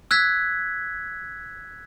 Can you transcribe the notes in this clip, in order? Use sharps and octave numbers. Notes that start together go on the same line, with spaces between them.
E6 F#6 G#6 B6